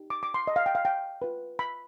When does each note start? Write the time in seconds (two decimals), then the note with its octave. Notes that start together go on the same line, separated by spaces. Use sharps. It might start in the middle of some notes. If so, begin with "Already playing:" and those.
Already playing: D#4 G4
0.10 D6
0.23 D6
0.34 C6
0.47 D#5
0.56 F5
0.66 G5
0.75 F5
0.85 G5
1.22 F4 B4
1.59 B5